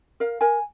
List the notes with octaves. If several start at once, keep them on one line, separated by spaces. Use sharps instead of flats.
A#4 F5
A#4 G#5